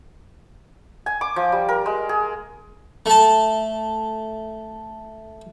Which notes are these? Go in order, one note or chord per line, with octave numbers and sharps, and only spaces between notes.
G#5
D6
F3
G3
A#4
G#3
G#4
A3 A5